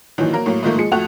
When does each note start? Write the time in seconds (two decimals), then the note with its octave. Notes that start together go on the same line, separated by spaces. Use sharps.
0.18 G#1 A#2 D#3 E3 F#3
0.33 F#3 A#3 A#4
0.46 A2 F#3 A#3
0.63 G#2 D#3 F3 A3 A#3
0.78 F3 G#3 C#7
0.92 F2 A3 F#4 F#5 F7